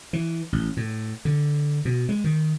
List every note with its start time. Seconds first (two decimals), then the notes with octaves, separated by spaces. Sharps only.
0.13 E3
0.52 A1
0.77 A2
1.25 D3
1.85 B2
2.09 G#3
2.24 D#3